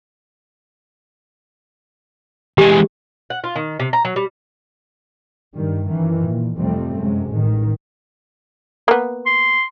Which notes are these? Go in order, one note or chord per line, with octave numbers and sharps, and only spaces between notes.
E3 G#3 G4
F#5
F4
D#3
C3
A#5
F#3
G3
G2 D#3 G3
F#2 D#3 E3
A#2
F2 C3 G3 A3 C4
F#2 C3 G#3
A1 D#3
A#3 B3
C6